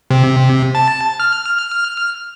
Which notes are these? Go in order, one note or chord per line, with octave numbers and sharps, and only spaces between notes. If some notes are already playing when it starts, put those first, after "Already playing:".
C3
A5
F6